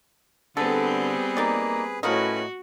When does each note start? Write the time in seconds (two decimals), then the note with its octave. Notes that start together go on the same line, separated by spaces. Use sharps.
0.57 D3 G3 B3 C4 G#4 A4 B4
1.37 A#3 D#4 D5
2.03 A2 F3 C#4 F#4 A#4 B4 D#5